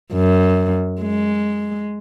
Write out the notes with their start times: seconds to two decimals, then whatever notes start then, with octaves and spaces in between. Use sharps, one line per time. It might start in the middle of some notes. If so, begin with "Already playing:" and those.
0.13 F#2
1.02 G#3